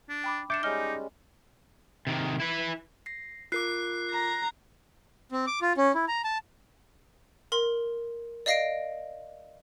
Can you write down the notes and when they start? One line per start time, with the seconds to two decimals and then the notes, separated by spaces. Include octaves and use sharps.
0.09 D4
0.24 G5 B5 D6
0.50 D4 E5 D6 G6 C#7 E7
0.63 G3 G#3 C#4 D#4 D#5 F6 G7
2.07 C3 D#3
2.40 E4 B4
3.06 A#6 C7
3.52 F4 A#4 D6 F#6 C7
4.10 A#5
5.32 C4
5.47 D6
5.62 F4
5.77 C#4
5.95 E4
6.08 A#5
6.24 A5
7.52 A#4 C6 F#7
8.46 D5 D#5 F5 A#6 C7 D7